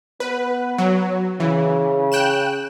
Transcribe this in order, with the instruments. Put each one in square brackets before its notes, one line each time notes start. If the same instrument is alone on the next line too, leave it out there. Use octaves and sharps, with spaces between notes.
[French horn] B3 [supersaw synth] B4
[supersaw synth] F#3
[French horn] C#3 [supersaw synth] E3
[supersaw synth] G5 F#6 E7